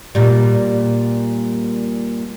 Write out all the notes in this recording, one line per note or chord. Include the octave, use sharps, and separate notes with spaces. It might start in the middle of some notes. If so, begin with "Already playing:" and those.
A#2 G3